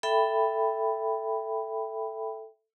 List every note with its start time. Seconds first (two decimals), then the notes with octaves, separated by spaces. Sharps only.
0.03 A4 E5 G5 B5